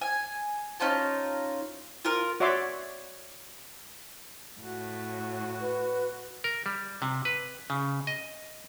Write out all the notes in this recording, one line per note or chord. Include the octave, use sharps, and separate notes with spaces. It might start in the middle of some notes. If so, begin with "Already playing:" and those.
G#5
C#4 D#4 F4 A5
F4 A#4
F#4 C#5 D5 E5 C6 D6
A2 F#4
B4
A#4
G3
C3
B4
C#3
D#5